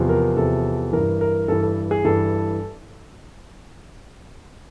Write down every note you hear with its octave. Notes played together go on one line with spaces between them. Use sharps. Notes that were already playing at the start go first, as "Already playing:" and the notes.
Already playing: E2 C3 F3
A#4
E2 C3 F3 A4
G2 E3 A#4
A#4
G2 E3 A4
A4
G#4
G2 E3 A4